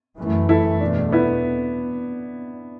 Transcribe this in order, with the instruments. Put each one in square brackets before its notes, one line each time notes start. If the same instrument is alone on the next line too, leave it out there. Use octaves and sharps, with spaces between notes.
[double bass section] F#2 E3 A3
[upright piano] E4 A4
[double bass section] E2 B2 A3 [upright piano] D4
[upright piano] B3 E4